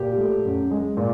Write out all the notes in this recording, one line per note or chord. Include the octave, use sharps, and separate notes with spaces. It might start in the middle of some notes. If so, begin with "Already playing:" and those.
Already playing: A#2 G4
A3
F#2
G#3
A#2